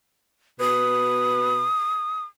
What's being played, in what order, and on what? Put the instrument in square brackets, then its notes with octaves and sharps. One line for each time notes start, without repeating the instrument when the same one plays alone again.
[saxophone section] B2 B4 [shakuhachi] D#6